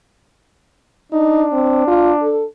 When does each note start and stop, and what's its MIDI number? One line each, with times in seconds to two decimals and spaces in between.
1.12 2.46 62
1.12 1.44 63
1.52 1.85 60
1.87 2.12 65
2.22 2.45 69